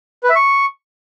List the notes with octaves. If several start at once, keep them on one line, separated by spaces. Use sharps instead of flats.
B4
E5
C#6